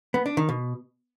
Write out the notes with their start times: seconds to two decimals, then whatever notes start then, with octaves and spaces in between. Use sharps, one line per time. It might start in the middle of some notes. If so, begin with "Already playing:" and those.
0.14 B3
0.26 D4
0.37 D#3
0.49 B2